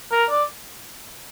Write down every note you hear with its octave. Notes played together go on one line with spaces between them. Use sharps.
A#4
D5